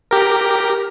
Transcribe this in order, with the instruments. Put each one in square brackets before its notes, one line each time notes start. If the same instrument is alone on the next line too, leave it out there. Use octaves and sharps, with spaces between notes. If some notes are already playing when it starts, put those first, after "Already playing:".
[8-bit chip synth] G4 A#4